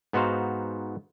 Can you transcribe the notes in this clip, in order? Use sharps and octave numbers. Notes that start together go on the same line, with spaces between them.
G#2 B3 D#4 F#4 C5 F5